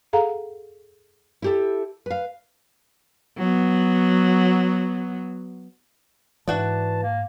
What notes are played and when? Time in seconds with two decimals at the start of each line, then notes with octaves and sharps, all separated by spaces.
0.13 G#4 A4 F5 F#5 A#5
1.42 E4 G4 A4
2.06 B4 F5
3.38 F#3 B3
6.48 G#2 E3 D4 F#4 D5 A5
7.02 A#3